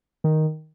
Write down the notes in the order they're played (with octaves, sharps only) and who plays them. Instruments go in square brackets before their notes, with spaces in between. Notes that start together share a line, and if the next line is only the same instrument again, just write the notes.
[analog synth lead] D#3